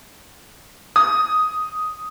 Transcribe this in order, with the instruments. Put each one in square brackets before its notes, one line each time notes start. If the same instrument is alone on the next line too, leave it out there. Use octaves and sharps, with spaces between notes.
[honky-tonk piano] D#6